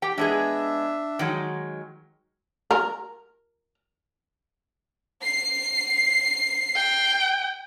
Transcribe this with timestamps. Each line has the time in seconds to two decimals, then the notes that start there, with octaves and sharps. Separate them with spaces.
0.02 G4 G5
0.18 G#3 B3 D4 G#4 E5
1.19 D#3 F#3 G#3
2.71 A#4
5.23 C7
6.76 G5